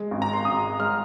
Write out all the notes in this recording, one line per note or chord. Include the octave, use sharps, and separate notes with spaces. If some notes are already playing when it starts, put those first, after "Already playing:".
Already playing: G#3
G#1
A#5
C6
G#1 D#6
G#3 F6